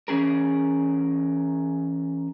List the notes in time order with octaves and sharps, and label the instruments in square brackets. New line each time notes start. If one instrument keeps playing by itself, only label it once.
[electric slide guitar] E3 C#4 G#4 A#4